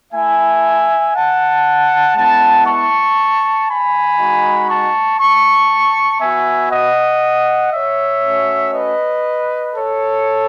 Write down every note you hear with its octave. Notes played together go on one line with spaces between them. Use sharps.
A3 E4 E5 G#5
F#5 A5
G#3 B3 E4 F#5 A5
A5 C#6
G#5 B5
G#3 D#4 F#4
A5 C#6
A5 C#6
B3 F#4 E5 G#5
D#5 F#5
C#5 E5
A3 C#4 F#4
B4 D#5
A4 C#5